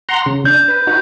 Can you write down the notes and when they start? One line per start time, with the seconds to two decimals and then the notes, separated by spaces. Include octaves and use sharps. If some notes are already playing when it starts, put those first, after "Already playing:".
0.09 F#5 A#5 C6
0.26 C#3
0.45 D4 G6
0.68 B4
0.87 D#4 F#4 B4